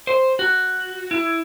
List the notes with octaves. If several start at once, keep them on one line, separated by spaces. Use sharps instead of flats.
C5
F#4
E4